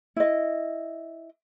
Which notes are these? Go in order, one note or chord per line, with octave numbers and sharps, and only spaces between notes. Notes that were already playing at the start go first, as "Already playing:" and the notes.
E4 D#5